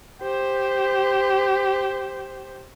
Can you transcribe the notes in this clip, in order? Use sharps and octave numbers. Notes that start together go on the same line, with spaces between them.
G4 C5